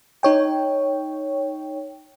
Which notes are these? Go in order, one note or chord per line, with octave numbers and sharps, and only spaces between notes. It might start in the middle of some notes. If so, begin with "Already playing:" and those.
D#4 C#5 G5